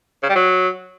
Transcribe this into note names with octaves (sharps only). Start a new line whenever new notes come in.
C#3
G3
F#3